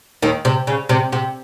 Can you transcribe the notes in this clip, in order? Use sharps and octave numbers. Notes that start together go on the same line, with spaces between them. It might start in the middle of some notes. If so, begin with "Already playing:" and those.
D#2 D#3
C3
C#3
C3
C3